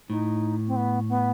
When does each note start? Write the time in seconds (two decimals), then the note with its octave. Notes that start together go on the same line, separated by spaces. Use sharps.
0.09 A2 D#4
0.67 C4
0.76 B3
1.08 B3